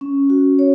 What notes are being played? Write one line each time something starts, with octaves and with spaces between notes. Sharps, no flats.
C#4
F#4
C#5